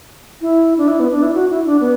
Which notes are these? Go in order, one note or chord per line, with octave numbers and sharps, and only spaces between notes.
E4
D4
E4
B3
D4
E4
F#4
E4
D4
B3